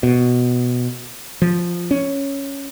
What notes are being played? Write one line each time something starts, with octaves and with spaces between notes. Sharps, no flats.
B2
F3
C#4